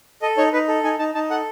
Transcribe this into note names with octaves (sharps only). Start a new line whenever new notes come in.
A4 D#5
D#4 C#5
D#4 B4
A4
D#4 G#5
D#4 A5
D#4 A5
A4 F#5